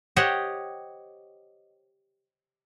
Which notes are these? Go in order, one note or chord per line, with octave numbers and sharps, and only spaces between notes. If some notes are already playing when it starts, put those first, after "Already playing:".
G4 C5 C#5 D#5 F#5 G5